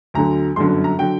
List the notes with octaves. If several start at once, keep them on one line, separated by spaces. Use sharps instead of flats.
D2 D3 F#3 A#5
G1 F#2 D3 F#3 C6
A#5
D3 F#3 G5